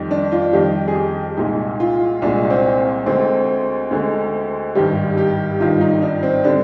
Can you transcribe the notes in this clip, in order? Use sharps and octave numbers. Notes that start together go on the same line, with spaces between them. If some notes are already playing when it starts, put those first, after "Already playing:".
Already playing: F2 D#3 G3
D4
F4
F2 D#3 G3 G4
G#4
G4
C2 A#2 G#3 D#4
F4
C2 A#2 G#3 D4
C4
D2 D3 G#3 C4
D2 D3 G#3
G#1 G2 D#3 G3 G4
G4
G#1 G2 D#3 G3 F4
D#4
D4
C4
D3 G3 D4